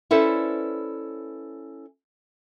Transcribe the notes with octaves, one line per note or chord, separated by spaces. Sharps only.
C#4 E4 A4 B4 C5 D5